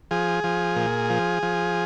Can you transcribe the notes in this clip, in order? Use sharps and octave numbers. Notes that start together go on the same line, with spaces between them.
F3 G#4
F3
A#2
F3
F3